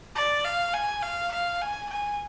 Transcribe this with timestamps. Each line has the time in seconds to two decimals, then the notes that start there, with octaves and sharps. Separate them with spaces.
0.15 D5
0.44 F5
0.73 G#5
1.02 F5
1.32 F5
1.61 G#5
1.90 G#5